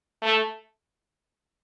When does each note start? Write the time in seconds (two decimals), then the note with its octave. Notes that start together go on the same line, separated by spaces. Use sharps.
0.22 A3